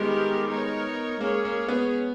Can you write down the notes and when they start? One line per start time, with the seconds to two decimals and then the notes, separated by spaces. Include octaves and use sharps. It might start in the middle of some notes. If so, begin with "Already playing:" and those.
Already playing: D#3 G3 G#3 B3 G4 A#4
0.47 B3 D#4 A#4 C#5
1.19 G#3 A#3 C#4 G#4 C#5
1.45 A#3
1.68 B3